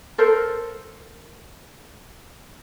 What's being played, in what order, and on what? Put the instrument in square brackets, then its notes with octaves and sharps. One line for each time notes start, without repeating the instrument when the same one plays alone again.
[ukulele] A4 A#4 C5